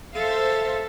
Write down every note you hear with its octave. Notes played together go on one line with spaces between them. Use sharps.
A4 C5 E5 F5